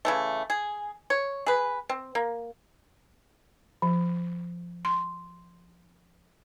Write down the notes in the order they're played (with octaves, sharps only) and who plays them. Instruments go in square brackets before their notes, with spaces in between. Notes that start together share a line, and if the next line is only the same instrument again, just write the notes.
[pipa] C#3 E3 A3
G#4
C#5
G#4 B4
C4
A#3
[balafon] F3
C6